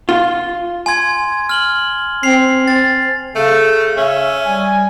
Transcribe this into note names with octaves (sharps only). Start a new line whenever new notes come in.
F4
G#5 C6 G#6
F6 F#7 G7
C4 C7 F7
C4 A6
C#3 A3
C#4 E5
G3 G#5